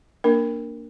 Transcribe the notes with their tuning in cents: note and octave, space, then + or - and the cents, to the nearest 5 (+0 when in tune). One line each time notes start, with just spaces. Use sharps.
A#3 +0 D4 +0 A#4 +0